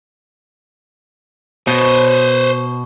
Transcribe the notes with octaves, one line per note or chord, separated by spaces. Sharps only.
B2 C5 C#5